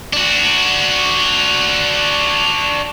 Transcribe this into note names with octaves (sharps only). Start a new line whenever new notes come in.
D4 F#4